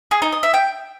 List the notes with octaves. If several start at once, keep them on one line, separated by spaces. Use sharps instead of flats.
G#4
D#4
D#5
E5
G5